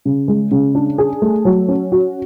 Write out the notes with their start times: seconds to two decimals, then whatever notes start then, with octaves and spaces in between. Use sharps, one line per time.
0.05 C#3
0.28 G#3
0.51 C#3
0.75 D4
0.98 G#4
1.22 A3
1.45 F#3
1.68 C#4
1.92 F#4